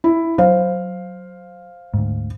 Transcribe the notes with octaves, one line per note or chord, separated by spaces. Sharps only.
E4
F#3 C5 F5
D2 G#2